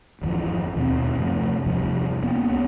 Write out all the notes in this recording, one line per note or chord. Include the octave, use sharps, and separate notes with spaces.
G#1 F2 E3 F3
D#2 B2 G#3 C4
F#2 C3 F3 A3
E2 G2 C3 F3
A#3 B3 C#4
C#2 B3